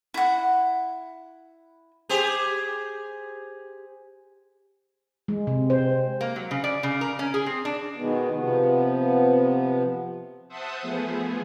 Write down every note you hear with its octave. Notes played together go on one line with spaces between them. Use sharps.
E4 F#5
G4 G#4 C5
G#3
C3
C5
A#3
F#3
C#3
D5
C#3
A#4
C#4
G#4
C4
D4
B2 D#3 G#3 B3
C3 F3 B3
C5 E5 F#5 A5 D#6
F3 A3 B3 G#4